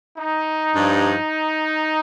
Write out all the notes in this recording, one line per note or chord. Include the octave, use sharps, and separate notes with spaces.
D#4
G2 F3